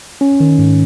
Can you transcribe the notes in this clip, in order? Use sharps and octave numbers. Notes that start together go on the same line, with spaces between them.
C#4
D#3
G#2